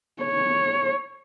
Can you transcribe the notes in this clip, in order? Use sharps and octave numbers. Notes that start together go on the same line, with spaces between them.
C#5